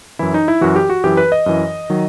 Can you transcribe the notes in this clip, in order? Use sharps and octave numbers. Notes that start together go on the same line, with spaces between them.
F#2 E3 E4
D#4
E4
F#2 E3 F#4
G4
F#4
F#2 E3 G4
B4
D#5
F#2 E3
D#3 F#3